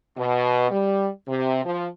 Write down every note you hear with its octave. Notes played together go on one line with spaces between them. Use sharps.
B2
G3
C3
F3